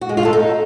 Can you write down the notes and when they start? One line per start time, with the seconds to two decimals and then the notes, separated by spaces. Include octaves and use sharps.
0.01 F#4
0.09 G#3
0.17 F4
0.25 A4
0.33 D#4